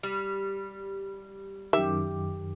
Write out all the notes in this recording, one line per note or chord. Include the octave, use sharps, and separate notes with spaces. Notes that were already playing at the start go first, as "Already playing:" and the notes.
G3
F#2 D#3 G4 E5